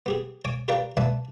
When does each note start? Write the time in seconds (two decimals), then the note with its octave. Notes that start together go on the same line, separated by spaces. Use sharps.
0.06 B3 G4 G#4
0.45 C#5 G#5 D6
0.68 G4 A#4 B4 D5 F5 G5
0.97 B4 D5 E5 F#5 G#5 A5